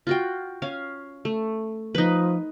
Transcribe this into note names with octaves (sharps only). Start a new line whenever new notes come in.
F4 F#4 G5
C#4 F5
A3
F3 D#4 B4